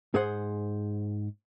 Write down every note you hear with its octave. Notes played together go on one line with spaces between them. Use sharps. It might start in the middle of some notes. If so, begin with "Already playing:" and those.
G#2 G#4 C5 F#5